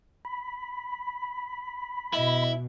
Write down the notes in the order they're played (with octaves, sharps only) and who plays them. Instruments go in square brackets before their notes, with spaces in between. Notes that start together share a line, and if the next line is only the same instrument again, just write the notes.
[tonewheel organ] B5
[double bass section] B2 [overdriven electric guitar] E4 [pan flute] D#5